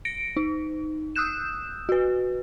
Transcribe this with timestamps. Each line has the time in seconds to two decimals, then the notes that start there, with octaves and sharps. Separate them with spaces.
0.05 A#6 C#7 D7
0.37 D#4
1.16 D#6 E6 F#6 G6 E7
1.89 F#4 B4